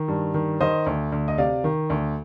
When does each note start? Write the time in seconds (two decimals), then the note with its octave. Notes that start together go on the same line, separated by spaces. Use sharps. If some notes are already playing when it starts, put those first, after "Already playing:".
Already playing: D#3
0.08 G2
0.34 D#3
0.60 D#3 C5 D#5
0.86 D2
1.12 D2
1.28 D#5
1.38 C3 D5 F5
1.64 D#3
1.90 D2